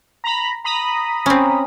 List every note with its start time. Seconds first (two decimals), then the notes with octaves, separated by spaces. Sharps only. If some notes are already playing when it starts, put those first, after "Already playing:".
0.24 A#5 B5
0.64 A#5 B5 D#6
1.26 C4 C#4